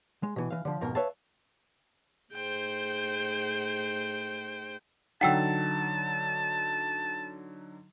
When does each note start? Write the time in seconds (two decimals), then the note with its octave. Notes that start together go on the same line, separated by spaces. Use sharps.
0.23 G#3
0.36 B2 E3
0.50 E3 F5
0.65 D3 F3
0.81 F2 G#2 B2 A#4
0.95 B4 C#5 E5 F5 A5
2.33 A2 D#4 G#4 C5 G5
5.21 D3 F#3 D#4 F#5 G5 A5 E6